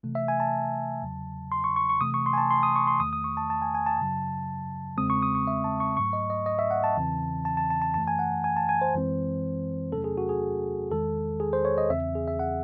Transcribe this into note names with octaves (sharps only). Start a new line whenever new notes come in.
C3 E3 A3
E5
G#5
A5
E2 C#3 F#3
C6
C#6
C#6
C#6
C3 E3 A3 D#6
C#6
C6
G#5
A5
C6
D#6
C#6
C6
E2 D#3 A3 D#6
D#6
C#6
A5
A5
G#5
G#5
A5
F#2 C#3 F#3
E2 C#3 G#3 C4 D#6
C#6
D#6
C#6
E5
A5
C#6
G#2 F#3 A3 C#6
D#5
D#5
D#5
E5
F#5
A5
E2 C#3 E3 C4
A5
A5
A5
A5
F#2 E3 A3 A5
G#5
F#5
G#5
A5
G#5
C5
F#2 E3 G#3 C4
E2 C3 F#3 A3 C#4 A4
G#4
F#4
G#4
E2 D#3 G#3 A4
G#4
C5
C#5
D#5
E2 C#3 E3 C4 E5
G#4
E5
F#5